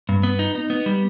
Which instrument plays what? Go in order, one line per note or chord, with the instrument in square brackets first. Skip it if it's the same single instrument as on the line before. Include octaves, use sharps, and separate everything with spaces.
[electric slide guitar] G2
B3
D#4
D#4
B3
G3